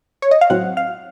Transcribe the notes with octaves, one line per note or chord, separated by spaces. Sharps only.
C#5
D#5
F5
A2 F#3 C4 F#5
F5